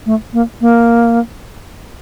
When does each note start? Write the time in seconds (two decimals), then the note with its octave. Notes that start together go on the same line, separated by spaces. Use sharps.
0.06 A3
0.33 A#3
0.61 A#3